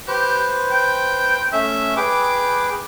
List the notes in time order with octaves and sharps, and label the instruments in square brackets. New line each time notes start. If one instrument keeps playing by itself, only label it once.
[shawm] G4 [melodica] B4 C5
[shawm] G5
[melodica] A3 C#4 [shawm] E5
[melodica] G#4 B4 G5 [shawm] D6